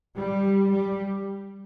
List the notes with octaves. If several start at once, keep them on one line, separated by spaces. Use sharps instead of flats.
G3
G3